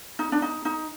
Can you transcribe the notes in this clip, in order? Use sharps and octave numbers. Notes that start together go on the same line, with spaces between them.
D#4
D4
D#4
D#4